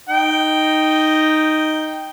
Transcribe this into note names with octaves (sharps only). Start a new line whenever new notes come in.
D#4 G5